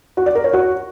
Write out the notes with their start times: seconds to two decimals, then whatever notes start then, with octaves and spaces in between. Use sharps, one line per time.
0.17 F#4
0.26 D5
0.35 A#4
0.44 C#5
0.53 F#4